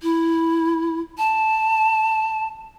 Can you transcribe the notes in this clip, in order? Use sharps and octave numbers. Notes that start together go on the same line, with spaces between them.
E4
A5